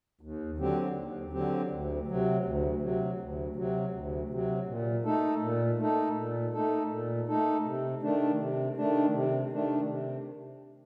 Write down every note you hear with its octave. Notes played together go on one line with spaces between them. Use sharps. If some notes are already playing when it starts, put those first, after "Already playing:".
D#2
D3 F#3 C4 G4
D#2
D3 F#3 C4 G4
D2
C3 F#3
D2
C3 F#3
D2
C3 F#3
D2
C3 F#3
A#2
A3 D#4 A4
A#2
A3 D#4 A4
A#2
A3 D#4 A4
A#2
A3 D#4 A4
C3
D#3 A3 D4
C3
D#3 A3 D4
C3
D#3 A3 D4
C3